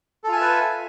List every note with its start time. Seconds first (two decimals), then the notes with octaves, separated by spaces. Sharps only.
0.24 A4
0.28 F4
0.32 G#5
0.37 E5
0.41 B4